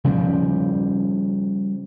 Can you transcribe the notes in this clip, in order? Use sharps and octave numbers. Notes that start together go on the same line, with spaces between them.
C#3 F3 G3